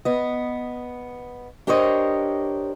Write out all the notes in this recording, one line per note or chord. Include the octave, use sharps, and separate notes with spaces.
B3 D#5
D4 G4 A#4 C5 C#5 D#5